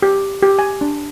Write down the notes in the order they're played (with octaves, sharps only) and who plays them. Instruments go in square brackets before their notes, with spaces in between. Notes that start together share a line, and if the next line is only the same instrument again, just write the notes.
[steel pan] G4
G4
G#5
D4